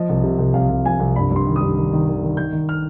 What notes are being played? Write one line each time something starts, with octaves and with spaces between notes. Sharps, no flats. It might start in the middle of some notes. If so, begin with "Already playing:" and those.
Already playing: F3 D#5
C2
C3
C2
C2 F5
C2
F3 G#5
C2
G2 B5
G2
C6
D#3
G2 D#6
D#3
D#3
D#3
D#3
D#3 G6
D#3
F6